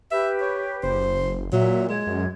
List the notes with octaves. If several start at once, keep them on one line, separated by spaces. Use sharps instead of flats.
G4 B4 E5
C#5
F#1 C5
A#2 F#3 E5
G#3 G#6
F#2